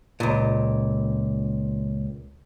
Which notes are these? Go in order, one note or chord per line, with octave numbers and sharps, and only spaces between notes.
C#2 A#2